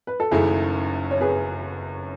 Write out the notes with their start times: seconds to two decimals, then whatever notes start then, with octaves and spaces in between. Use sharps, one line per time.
0.07 B4
0.20 A4
0.31 F#1 F#2 D#3 A3 E4 G#4
1.11 C#5
1.21 G#4 B4